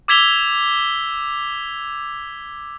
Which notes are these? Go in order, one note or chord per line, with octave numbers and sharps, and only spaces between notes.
D6 E6 G#6 B6 F7 G7